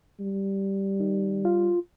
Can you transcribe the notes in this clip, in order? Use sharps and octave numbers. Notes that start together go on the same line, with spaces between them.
G3
D#3
F4